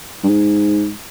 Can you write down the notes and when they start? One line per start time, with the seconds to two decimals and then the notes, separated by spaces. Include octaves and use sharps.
0.23 G2
0.29 G#2